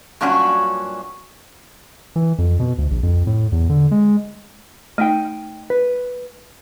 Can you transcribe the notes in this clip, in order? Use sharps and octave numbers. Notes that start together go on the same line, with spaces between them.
G2 A#2 F#3 C#4 D4 F#4
E3
F2
B2
D2
A#1
F2
A2
E2
D3
G#3
A3 D#4 D#5 G5
B4